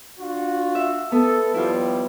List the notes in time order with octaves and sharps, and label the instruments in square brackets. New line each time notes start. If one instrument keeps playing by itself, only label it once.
[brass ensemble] D4 F4 F#4
[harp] E5
[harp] B3 [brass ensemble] A4
[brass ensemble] D#2 F3 G3 [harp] E4 F4